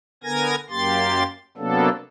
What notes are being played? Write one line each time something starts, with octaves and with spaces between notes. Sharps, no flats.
D3 B3 A#4 G#5 G#6 A#6
F#2 A#3 G4 C6 A6
C3 F#3 A#3 B3 D4 A4